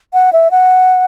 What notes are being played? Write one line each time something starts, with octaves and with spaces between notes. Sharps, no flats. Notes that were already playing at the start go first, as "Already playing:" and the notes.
F#5
E5
F#5